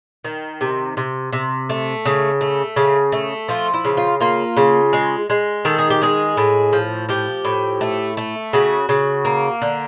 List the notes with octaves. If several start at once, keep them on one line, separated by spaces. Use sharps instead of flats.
D#3
C3
C3
C3
A3
C#3
A3
C#3
A3
F3 F4
E4
C#3
F4
A#3 F4
C#3
G#3
G#3
D#3 A4
G#4
G4
G#3 G#4
A2
F3
F3 G4
A2
A3
A3
C#3 F#4
C#3
A#3
D3